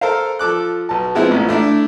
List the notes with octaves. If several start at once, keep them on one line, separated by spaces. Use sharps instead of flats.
A4 A#4 C5 F5
F3 A4 D6 F#6
B1 A5
F3 G#3 B3 C4 E4
A1 A#2
A3 D4 E4 D5